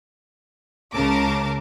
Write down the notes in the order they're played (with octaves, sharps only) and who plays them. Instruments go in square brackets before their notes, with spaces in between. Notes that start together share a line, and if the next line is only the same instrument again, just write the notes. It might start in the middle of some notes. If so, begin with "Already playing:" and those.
[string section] C#2 C#3 A#4 A5 D6